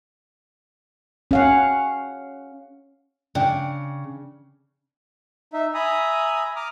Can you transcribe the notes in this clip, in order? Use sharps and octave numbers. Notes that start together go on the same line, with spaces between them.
C#4 F5 F#5
C#3 D4 G5
D#4 E5
E5 G#5 A#5 B5 D#6
A#5 D6 D#6 F6